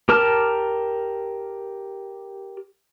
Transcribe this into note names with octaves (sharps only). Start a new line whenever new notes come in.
G4 A#4 A5 F6